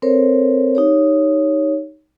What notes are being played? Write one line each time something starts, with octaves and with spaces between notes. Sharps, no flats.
C4 A4 A#4 C5 C#5
D#4 G4 C#5